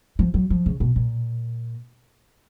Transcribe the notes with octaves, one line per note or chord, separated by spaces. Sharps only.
F3
F#3
F3
C#3
B2
A#2